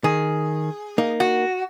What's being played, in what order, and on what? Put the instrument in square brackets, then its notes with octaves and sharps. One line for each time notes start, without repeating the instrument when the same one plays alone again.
[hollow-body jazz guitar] D#3 [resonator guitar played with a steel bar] G#4
[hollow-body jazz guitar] A#3 D#4
[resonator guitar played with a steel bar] F#4